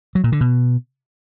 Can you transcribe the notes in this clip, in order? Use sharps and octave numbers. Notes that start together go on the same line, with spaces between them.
F#3
A#2
D3
B2